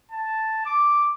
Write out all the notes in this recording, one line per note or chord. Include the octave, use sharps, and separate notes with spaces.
A5
D6